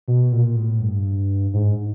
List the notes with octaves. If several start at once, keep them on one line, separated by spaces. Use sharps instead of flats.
B2
A#2
A2
G2
G#2